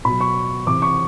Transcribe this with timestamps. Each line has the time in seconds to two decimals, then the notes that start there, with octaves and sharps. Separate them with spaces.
0.05 B2 F#3 B5
0.21 C#6
0.67 C3 E3 D6
0.82 C#6